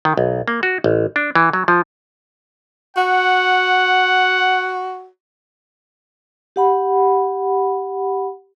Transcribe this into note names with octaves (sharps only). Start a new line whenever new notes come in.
D#3
B1
A#3
F#4
A1
D4
E3
F#3
F3
F#4 F#5
G4 F#5 B5